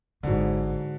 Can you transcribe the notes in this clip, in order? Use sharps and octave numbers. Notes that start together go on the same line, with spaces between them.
G#1 G#2 D3 F#3 A#3